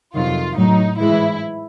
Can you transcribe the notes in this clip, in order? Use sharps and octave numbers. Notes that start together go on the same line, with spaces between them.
F2 C3 D#3 F#3 F4
A2 F#3 D#4
G#2 E3 G#3 E4